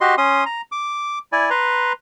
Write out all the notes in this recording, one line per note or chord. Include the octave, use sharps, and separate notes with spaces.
F#4 G4 D#5 C6
C#4 C6 D#6
A#5
D6
E4 D5 G#5
B4 A#5 C6